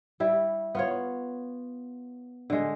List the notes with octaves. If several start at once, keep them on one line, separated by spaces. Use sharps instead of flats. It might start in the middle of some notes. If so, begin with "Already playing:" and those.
G3 E4
B3 F4 C#5
D3 G#3